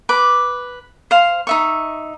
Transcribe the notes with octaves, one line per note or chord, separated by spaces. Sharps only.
B4 D6
C5 F5
D#4 E5 C#6